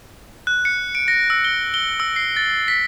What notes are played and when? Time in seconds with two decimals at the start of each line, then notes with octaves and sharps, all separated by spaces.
0.47 F#6
0.65 C#7
0.95 D7
1.08 A#6
1.30 E6
1.44 G7
1.74 G7
2.00 E6
2.16 C7
2.37 A6
2.68 B6